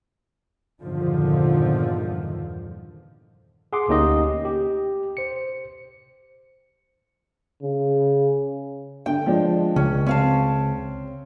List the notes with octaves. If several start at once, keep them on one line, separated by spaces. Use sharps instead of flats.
E2 G2 A#2 D3 D#3 F3
G#4 F#5 C6 D6
D2 A#3 C#4 D#4 G4 D#5
G4
C5 C#7
C#3
D3 G5
F3 G#3 D4
C#2 C#4
C4 C#4 F5 A5